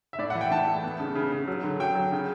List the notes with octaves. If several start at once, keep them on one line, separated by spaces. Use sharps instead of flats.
E5
A2 D5
F#5
E3
G5
A2 A5
A3
B3
C#3
C#3
C#3
F#3
D3
F#3 G5
F#3
C#3